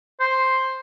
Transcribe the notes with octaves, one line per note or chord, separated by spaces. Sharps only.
C5